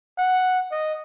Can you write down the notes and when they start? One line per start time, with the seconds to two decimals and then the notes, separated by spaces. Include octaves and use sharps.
0.18 F#5
0.72 D#5